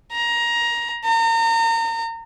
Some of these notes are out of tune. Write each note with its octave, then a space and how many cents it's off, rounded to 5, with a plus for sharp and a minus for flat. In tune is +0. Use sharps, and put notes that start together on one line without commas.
A#5 +20
A#5 -35